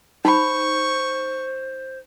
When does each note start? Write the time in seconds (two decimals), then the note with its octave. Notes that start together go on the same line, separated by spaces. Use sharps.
0.25 D#4 C5 B5 C#6